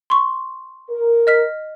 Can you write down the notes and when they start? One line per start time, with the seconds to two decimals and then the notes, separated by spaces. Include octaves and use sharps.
0.10 C6 C#6
0.90 A#4
1.27 D#5 F6 B6